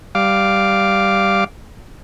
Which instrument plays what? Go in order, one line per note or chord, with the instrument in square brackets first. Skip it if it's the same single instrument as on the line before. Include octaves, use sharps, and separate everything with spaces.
[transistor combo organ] G3 F5 D6